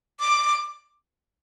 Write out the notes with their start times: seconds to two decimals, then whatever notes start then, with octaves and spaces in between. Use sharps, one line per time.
0.20 D6